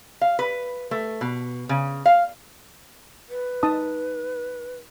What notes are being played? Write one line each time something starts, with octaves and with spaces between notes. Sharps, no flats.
F5
B4
A3
B2
C#3
F5
B4
D#4 A5 D#6